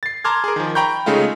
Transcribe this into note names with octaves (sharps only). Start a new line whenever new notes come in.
A6 C7
A5 A#5 C6 D6 F6 G#6
G#4 A#4
D#3 F3
G5 A#5 B5 C#6 G6
C#3 G#3 A3 D#4 F4